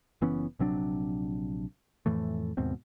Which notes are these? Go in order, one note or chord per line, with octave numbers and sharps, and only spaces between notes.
F#1 E3 B3 C#4
A#1 C3 F#3 D4
F2 A2 E3 A3
D#2 G#2 B2 C4